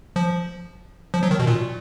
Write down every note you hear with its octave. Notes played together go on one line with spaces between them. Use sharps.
F3
F3
F#3
D#3
B2
A#2